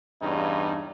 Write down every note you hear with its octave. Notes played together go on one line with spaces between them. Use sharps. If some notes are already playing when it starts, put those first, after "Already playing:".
E2 G2 C#3 D#4